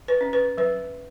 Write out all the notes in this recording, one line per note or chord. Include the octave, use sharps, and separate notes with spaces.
B4
C#4
B4
F#3 B4